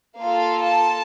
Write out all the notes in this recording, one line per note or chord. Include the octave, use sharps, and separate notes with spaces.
A#3 F4 A4 F5
A5